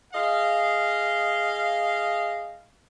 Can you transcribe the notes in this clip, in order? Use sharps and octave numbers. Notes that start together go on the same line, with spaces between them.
G#4 D#5 F5